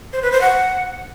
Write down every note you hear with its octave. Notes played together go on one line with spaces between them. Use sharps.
C5
B4
C5
F#5